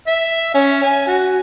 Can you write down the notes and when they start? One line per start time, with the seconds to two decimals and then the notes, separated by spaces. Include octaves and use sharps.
0.07 E5
0.54 C#4
0.83 G#5
1.07 F#4